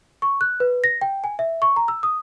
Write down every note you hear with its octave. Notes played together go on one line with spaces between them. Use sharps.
C#6
F#6
B4
A#6
G5
G#5
E5
C#6
A#5
E6
D#6